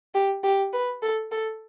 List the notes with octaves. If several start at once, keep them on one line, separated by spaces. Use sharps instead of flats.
G4
G4
B4
A4
A4